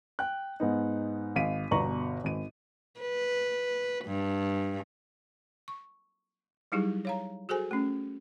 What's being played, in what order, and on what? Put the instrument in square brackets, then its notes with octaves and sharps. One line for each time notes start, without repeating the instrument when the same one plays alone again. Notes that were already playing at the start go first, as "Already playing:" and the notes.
[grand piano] G5 F#6
G#2 B3 D#4
G#1 F5 B6 D#7
G1 B2 D5 A#5 C#6 F#7
G#1 D#7
[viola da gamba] B4
G2
[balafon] C#6
F#3 G3 D#4 E4 G4 G#4
C#5 F5 A#5
F#4 G#4 A4 C5 G#5
A3 C#4